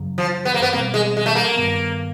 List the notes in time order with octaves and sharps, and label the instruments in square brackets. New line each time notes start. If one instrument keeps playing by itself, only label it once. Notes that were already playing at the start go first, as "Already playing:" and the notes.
Already playing: [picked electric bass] F#2 C#3 F#3
[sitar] F3
B3
A#3
B3
[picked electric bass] B2 G3 C4 [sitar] A#3
[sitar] G#3
G#3
A3
A#3
[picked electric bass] G2 D#3 G3 B3